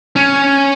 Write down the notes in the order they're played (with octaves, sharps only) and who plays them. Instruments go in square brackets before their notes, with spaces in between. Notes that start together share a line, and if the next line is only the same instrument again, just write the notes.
[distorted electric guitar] C#4